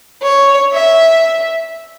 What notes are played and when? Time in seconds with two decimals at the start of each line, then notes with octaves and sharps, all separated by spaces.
0.23 C#5
0.73 E5